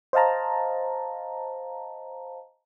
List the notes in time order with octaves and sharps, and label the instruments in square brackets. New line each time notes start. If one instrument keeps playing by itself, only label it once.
[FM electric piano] C5 D#5 F5 A5 A#5